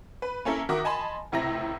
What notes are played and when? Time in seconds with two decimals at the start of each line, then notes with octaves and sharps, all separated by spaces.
0.22 B4
0.45 A#3 C#4 E4 A4 A#4
0.69 D#3 F#4 A#4 E5 D6 D#6
0.84 D#5 G#5 A5 B5 C6
1.32 C#2 A2 C3 E4 A#5 A#6